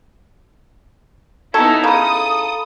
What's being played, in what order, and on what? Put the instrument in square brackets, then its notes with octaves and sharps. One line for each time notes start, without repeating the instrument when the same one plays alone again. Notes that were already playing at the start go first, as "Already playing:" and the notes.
[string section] B3 D#4 E4 [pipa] C#4 F#4 A4 [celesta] G#6 E7
[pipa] C#3 E3 [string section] A4 D#6 [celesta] F5 A#5 B5